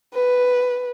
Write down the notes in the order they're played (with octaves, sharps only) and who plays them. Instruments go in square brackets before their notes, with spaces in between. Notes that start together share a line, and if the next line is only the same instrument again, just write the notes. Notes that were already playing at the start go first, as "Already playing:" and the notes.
[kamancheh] B4